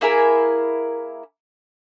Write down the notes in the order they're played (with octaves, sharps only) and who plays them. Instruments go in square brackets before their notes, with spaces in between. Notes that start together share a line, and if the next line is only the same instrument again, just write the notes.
[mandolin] A#3 E4 G#4 A#4